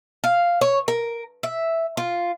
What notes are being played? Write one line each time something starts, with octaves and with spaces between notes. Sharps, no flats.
F5
C#5
A#4
E5
F4